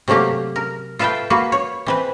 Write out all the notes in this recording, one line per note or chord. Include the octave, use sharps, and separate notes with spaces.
C3 F#3 A3 A#3 G4
A#4
F4 A4 B4 E5 F5 G5
A#3 F#4 B4
C#5
E3 C4 B4